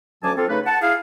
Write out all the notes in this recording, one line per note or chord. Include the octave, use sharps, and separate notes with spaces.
D2 F#3 C#4 G#5 A5 D6
C4 F4 A4
C#3 A3 D#4 B4
F#5 A5
E4 G#4 F5